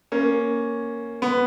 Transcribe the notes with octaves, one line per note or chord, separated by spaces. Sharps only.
A#3 C#4
B3